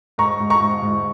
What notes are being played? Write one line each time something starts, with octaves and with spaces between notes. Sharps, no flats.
G#2 A#5 C#6
G#2
A#5 C#6
G#2
G#2